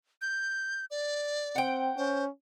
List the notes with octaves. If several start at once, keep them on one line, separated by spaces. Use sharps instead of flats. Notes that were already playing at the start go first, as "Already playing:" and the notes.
G6
D5
C4 F#5 G5
C#4 C5